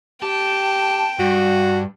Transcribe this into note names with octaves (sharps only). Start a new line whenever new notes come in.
G4 G5 A5
G2 F#4